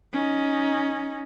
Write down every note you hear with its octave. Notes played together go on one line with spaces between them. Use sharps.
C#4 D#4